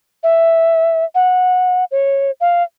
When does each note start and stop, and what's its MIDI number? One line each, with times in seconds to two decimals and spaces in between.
0.23 1.05 76
1.15 1.84 78
1.91 2.31 73
2.41 2.63 77